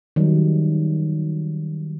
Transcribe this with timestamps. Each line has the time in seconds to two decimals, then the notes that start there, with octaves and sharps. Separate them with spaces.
0.16 D#3 F#3 G3